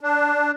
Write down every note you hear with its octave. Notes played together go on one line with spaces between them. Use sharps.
D4